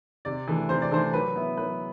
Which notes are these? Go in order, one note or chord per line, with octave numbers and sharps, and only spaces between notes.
C3 D5
E3 A3 D4
C3 C5
D5
E3 A3 D4 C5
F#3 B4
B3 E4
F#3 B4